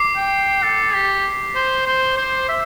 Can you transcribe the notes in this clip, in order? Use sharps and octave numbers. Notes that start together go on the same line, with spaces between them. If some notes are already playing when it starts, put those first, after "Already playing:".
Already playing: D6 C7
G5
A4
G4
C5
C5
C5
E5